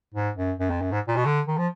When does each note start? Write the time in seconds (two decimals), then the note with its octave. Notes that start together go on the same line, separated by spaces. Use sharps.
0.14 G#2
0.37 F#2
0.59 F#2
0.70 F2
0.81 F#2
0.92 G#2
1.08 A#2
1.16 B2
1.25 D3
1.48 D#3
1.58 F3